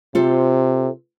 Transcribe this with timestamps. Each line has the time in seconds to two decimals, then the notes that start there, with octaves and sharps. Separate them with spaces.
0.15 C3 F4 A4 C5